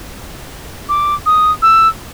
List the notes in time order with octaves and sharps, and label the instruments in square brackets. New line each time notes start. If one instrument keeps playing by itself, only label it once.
[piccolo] D6
D#6
E6